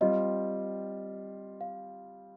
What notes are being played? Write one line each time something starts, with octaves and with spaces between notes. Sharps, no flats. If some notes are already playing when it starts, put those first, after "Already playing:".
G3 C4 F4 D#5
F5